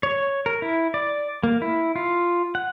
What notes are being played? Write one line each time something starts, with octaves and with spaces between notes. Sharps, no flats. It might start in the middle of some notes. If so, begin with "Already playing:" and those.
C#5
A#4
E4
D5
A#3
E4
F4
F#5